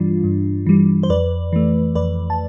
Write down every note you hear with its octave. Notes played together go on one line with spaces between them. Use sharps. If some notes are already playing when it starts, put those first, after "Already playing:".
Already playing: G2 E3 G3 D4 F4
G2
E3 G3
C5
F2 B4 D5
E3 A3
F2 B4 D5
A5